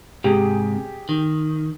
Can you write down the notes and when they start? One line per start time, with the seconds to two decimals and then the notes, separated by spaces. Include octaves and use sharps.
0.24 G#2 C3 G4 G#4
1.09 D#3